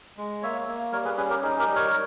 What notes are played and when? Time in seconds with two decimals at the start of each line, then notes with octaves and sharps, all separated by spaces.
0.17 G#3
0.42 A#3 C#5 E5
0.68 A#3
0.92 G3 A#4 C#5
1.04 G#4 B4
1.17 C#4 G#4 B4
1.30 G4 A#4
1.42 D#4 G#4
1.59 G4 A#4
1.67 G3
1.75 A#4 C#5